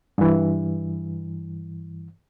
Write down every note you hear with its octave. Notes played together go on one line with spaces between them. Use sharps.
G2 E3